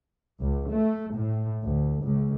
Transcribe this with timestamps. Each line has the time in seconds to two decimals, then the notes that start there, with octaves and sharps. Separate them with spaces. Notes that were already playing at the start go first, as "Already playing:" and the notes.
0.40 C#2
0.72 A3
1.15 A2
1.63 D2
2.03 C#2